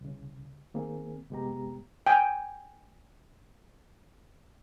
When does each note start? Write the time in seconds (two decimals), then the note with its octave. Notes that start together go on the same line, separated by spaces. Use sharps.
0.01 C2 C#3
0.74 D#3 A#3 C4 G#4
1.30 F#2 C3 G#3 B3 G4 A#5
2.07 G5 G#5